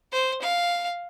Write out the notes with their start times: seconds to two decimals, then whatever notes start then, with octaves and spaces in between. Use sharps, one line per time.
0.12 C5
0.42 F5